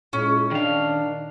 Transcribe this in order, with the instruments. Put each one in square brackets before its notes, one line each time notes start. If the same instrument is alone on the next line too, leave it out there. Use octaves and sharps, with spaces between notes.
[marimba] A#2 [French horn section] G#3 E4 F4 [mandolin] C#4
[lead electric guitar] D#3 F5 [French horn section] D4